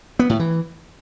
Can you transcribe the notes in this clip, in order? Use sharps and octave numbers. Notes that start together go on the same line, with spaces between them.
B3
A2
E3